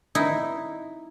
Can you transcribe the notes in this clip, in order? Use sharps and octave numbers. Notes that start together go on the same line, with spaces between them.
D#4 E4